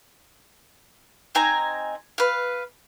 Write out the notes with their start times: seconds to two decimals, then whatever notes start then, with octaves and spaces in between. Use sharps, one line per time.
1.35 C4 D#4 G#5 A#5
2.18 B4 F5